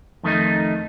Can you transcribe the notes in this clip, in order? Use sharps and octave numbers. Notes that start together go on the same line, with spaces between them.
F2 D#3 A3 B3 D#4